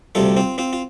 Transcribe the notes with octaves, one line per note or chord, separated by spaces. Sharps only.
D2 C3 G3 F4 A4
C4 F4
C4 F4
F4